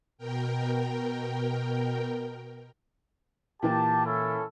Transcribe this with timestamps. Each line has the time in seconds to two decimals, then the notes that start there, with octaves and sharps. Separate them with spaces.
0.18 B2 A#4 G5
3.63 A#2 E3 A#3 G4 A5
4.05 C#4 E4 A4